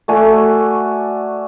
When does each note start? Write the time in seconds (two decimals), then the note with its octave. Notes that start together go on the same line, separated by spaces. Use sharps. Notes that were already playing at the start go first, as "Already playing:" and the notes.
0.08 A3 F#4 D5 G#5